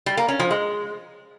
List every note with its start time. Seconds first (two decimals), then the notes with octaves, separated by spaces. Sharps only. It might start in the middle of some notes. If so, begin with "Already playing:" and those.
0.06 G3
0.17 A#3
0.28 C#4
0.40 F3
0.51 G#3